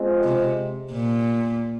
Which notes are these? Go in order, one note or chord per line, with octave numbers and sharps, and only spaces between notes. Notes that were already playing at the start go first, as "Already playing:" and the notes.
Already playing: G#3 C4 F4 C5 D#5
C3
A#2